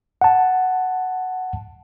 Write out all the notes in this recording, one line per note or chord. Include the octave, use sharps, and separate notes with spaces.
F#5 A5